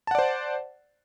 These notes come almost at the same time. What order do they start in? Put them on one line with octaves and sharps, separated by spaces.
A5 F#5 D5 C5